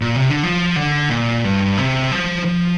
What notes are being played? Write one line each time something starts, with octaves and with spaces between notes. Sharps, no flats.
A#2
C3
D3
F3
D3
A#2
G2
C3
F3
F3